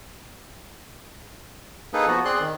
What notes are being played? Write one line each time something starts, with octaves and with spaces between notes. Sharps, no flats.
A#3 D#4 G#4 A4 B4
F3 B3 F#4
C4 G#4 D5 C6 F#6
D#3